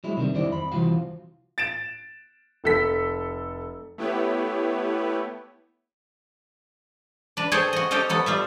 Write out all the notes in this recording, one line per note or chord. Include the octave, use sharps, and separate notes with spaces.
F#3 G#3 E4
C3 D#3 G3
F#2 D#3 G3 C4 E4 D5
F2 B5
C2 E3 F3 F#4 F5
A6 D7 E7
F1 A4 B6
A3 B3 E4 G4 B4 C#5
D4 B4
G#4 A4 C5 C#5 G5 A5
F#4 D#5
G4 A4 C5 D#5 F5
F#3 B3 A4
G3 F4 E5